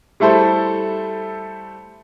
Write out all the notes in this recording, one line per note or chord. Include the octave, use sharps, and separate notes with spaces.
G3 A3 E4 A4 C5